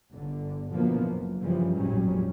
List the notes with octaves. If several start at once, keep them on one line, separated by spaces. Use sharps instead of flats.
G1 D3
B2 D3 E3 F3 A#3 B3
F#1 F#2
G2 C#3 E3 F3 G3
G#1 F2 A#2 F#3 G3 C#4